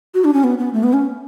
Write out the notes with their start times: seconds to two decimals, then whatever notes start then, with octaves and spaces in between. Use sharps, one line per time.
0.14 F#4
0.24 D4
0.33 C#4
0.44 B3
0.58 B3
0.73 A3
0.83 B3
0.93 C#4